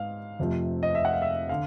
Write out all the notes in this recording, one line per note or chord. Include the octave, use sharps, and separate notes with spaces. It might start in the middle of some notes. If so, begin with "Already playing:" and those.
Already playing: G#2 F5
F2 C3 F3 A3
D#5
E5
F#5
F5
E5
D3 F5